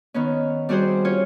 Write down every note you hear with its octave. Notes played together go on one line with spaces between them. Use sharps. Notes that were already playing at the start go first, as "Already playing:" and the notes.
D#3 B3 C#4
G3 C4 F#4 G#4 C5
C#4 F4 C#5